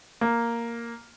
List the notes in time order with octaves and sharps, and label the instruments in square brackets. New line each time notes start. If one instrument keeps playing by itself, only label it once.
[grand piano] A#3